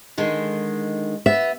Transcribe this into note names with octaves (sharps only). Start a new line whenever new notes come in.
D3 D#3 G#3
B3 E5